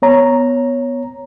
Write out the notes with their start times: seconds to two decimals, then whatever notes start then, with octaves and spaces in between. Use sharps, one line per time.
0.02 B3 C#5 A#5